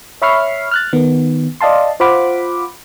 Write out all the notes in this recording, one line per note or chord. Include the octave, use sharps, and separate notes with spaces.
C#5 E5 B5 C#6 F6 C7
F6 F#6 A6
D#3 B3
D5 D#5 F5 A5 C6
F4 C5 F5 F#5 B5 D6